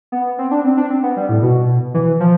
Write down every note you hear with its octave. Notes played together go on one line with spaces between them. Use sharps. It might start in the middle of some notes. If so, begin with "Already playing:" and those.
B3
C4
D4
C4
D4
C4
B3
G3
A2
B2
E3
F3